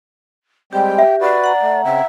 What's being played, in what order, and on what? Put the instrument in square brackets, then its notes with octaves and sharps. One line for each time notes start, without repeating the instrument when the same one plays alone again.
[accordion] G3 G#3 C4 [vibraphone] G4 [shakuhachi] G5
[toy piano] E5
[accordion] F#4 B4 [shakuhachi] D5
[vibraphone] F#5 A#5
[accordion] A3
[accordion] C#3 C4 [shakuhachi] E5